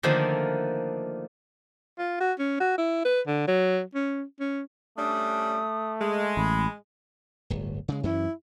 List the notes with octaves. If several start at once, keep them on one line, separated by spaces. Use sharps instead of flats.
D3 D#3 F3 A3 A#3 D4
F4
F#4
C#4
F#4
E4
B4
D3
F#3
C#4
C#4
G3 A3 C#4 D4 D#6
G#3
A1 B5
D1 G1
C#3 G#3
F#2 E3 C#4 E4